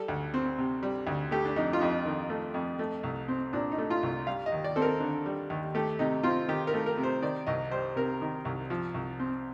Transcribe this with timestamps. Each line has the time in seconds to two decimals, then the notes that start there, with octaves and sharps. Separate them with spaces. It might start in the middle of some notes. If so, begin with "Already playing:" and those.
Already playing: G3 A4
0.08 D2
0.34 C4
0.58 C3
0.83 G3
1.07 D2
1.31 A3 G4
1.45 D4
1.56 F2 D#4
1.73 F4
1.80 F2 D#4
2.05 D#3
2.30 A3
2.54 F2
2.79 A3
3.03 C2
3.28 C4
3.53 A#2 D4
3.72 D#4
3.78 A3
3.90 F4
4.03 C2
4.27 G3 F5
4.46 D#5
4.52 D#2
4.64 D5
4.76 C4 A4
4.82 A#4
5.00 D3
5.26 G3
5.50 D#2
5.75 A3 G4
5.99 C3 D#4
6.23 C4 F4
6.48 D#3 G4
6.67 A#4
6.74 A3
6.86 A#4
6.97 C3
7.03 C5
7.22 D#3 D5
7.47 C2 D#5
7.71 G3 C5
7.96 C3 A#4
8.21 D#3
8.45 C2
8.70 F3
8.94 C2
9.20 C4